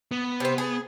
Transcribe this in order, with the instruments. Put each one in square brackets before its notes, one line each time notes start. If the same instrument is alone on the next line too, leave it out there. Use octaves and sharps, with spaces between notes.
[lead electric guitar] B3
[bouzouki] C3 C4
G#4